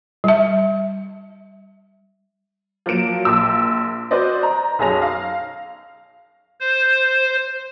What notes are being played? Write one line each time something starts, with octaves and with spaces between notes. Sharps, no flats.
G3 E5
F3 F#3 A#3 D7 E7
A#1 A#2 E6
F#4 B4 C5 D5 D#5
A#5
B1 F#2 G#4 C#5 A#6 F7
F5
C5